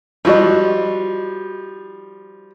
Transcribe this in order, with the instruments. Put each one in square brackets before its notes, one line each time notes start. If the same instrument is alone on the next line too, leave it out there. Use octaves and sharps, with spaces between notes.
[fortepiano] F3 G3 [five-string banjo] E4 F#4 D#5